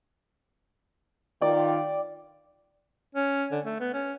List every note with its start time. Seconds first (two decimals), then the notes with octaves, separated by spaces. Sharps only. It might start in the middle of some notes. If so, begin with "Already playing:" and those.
1.41 D#3 F4 D5 G5
3.15 C#4
3.52 D3
3.65 A3
3.80 B3
3.93 C#4